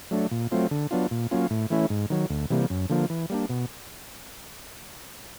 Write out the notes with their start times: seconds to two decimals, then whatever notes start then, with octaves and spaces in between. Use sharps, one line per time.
0.11 F#3 A3 D4
0.31 A#2
0.51 F#3 A3 C4 F4
0.71 D3
0.91 F#3 B3 D4 F4
1.11 A#2
1.31 F#3 A#3 C#4 F4
1.50 A2
1.70 E3 A3 C#4 E4
1.90 G#2
2.10 D#3 F#3
2.30 D2
2.50 C3 E3 G3 A#3
2.70 F#2
2.90 D3 F3 A#3
3.10 E3
3.30 G3 A#3 D4
3.50 B2